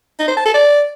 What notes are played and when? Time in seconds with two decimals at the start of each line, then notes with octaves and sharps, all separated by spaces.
0.19 D#4
0.28 C5
0.37 A5
0.45 A4
0.54 D5